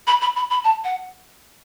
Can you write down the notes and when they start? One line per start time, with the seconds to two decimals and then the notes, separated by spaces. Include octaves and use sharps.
0.07 B5
0.21 B5
0.36 B5
0.50 B5
0.64 A5
0.84 F#5